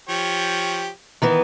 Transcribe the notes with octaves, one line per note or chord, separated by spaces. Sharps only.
F3 G4 C#5
D#3 E3 B3